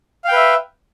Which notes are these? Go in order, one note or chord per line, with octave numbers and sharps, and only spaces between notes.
B4 E5 F5 G5